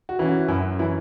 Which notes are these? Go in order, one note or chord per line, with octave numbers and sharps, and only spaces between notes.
F#4
E3 C#4
F#4
F#2 E4
E3 C#4 E4